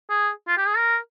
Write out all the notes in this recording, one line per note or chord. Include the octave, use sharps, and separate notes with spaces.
G#4
F4
G4
G#4
A#4